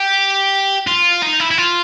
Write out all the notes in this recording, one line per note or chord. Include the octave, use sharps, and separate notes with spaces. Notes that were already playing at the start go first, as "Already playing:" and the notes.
Already playing: G4
F4
D#4
E4
E4
F4